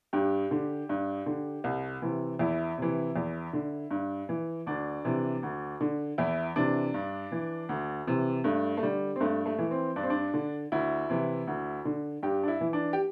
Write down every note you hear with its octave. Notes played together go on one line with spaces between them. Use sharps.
G2 G4
D3
G2
D3
C2
C3 E3
E2 E4
C3 E3
E2
D3
G2
E3
D2 D4
C3 E3
D2
D3
E2 E4
C3 E3 D4
G2
E3
D2
C3 E3
G2 A3
A3
D3 G3
C4
G2 A3
A3
E3
C4
G2 D4
C4
D4
D3
D2 E4
C3 E3
D2
D3
G2 G4
D4
E4
E3
D4
G4